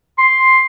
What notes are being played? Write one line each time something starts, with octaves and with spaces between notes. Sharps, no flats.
C6